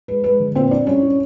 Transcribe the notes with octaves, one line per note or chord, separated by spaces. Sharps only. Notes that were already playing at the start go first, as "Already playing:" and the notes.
G#3 B4
G#3 B4
D3
A#2 C4 C5
D4 E4 D5
G3 C#4 C#5
E4